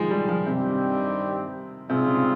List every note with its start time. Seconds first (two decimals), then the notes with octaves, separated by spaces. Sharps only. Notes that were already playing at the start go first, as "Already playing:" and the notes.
Already playing: D#3 F3 G#3
0.11 G3
0.29 F3
0.46 G2 C3 D#3 G3 C4 G4
1.89 G#2 C3 G3 C4 F4 G#4
2.07 C#3